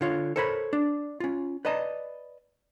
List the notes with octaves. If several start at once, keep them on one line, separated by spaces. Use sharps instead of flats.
D3 F4 C#5
A4 A#4 C5 C#5 E5 B5
D4
C#4 F4
B4 D5 D#5 A5 A#5